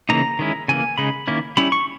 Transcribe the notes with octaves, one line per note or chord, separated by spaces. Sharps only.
C#3 E3 A#3 D#4 A#5
D#3 G#3 C#4 E4
C#3 E3 A#3 G#5
C#3 G#3 D#4 B5
D#3 A#3 C#4 E4
G3 C#4 E4 B5
C#6